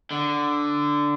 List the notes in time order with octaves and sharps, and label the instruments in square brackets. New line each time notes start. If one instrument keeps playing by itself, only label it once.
[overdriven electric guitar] D3